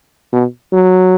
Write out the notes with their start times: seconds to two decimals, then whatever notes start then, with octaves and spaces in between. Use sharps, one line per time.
0.33 B2
0.73 F#3